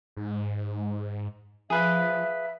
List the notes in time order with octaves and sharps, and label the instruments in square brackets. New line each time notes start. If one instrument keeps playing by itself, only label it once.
[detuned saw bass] G#2
[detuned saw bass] F3 [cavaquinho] G#4 B4 F5 [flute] E5